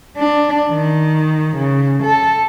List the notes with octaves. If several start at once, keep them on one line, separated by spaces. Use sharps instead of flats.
D4
D#3
C#3
A4